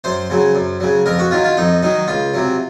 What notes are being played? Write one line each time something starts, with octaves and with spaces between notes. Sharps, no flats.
F#2 C5
C#3 F#3
F#2
C#3 F#3
F2 A#4
F#4
D#3 F#3 F4
F4
F2 D#4
D#3 F#3 D#4
C#2 F4
C3 F#3